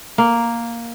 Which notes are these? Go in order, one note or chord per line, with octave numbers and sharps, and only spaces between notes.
A#3